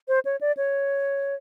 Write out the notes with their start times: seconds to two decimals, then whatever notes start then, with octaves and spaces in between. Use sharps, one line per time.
0.08 C5
0.25 C#5
0.41 D5
0.57 C#5